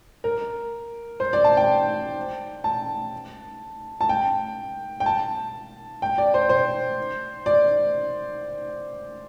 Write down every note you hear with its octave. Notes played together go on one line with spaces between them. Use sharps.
A#4
C5
D5
A5
G5
A5
A5
G5
G5
A5
G5
D5
C5
C5
D5